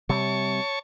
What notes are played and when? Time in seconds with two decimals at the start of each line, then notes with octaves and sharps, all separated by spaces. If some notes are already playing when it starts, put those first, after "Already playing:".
0.09 C3 G3 C#5 A5 C#6